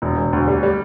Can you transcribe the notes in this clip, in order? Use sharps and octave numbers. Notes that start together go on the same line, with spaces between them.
E1
E1
D2
G3
G3